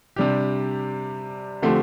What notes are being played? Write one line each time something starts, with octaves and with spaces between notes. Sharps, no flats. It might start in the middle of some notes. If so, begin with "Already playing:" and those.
C3 G3 D4 G4
D3 F3 A3 C4 G4